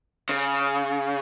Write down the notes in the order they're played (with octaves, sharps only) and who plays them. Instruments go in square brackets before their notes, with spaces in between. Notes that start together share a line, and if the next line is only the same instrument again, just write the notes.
[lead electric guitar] C#3